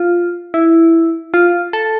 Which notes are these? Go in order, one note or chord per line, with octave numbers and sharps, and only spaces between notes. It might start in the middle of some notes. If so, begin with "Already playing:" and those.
Already playing: F4
E4
F4
A4